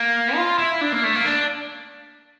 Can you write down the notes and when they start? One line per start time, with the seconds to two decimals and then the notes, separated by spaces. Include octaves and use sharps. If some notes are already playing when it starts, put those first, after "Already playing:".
Already playing: A#3
0.36 F4
0.58 E4
0.81 D4
0.92 A#3
1.04 A3
1.15 A#3
1.25 D4